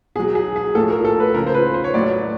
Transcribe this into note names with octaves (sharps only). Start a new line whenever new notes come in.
B2 F#3 G#4
G#4
G#4
A2 F3 A4
A#4
A4
B4
C#3 F3 A#4
C5
B4
C5
C#5
A2 F#3 D5